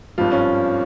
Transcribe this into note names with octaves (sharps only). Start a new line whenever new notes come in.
G#1 G2 F3 F4
C#4